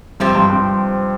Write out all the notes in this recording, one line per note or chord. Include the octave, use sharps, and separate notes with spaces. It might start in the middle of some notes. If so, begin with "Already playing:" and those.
G2 C3 F3 C4 G4 C5
G2
G2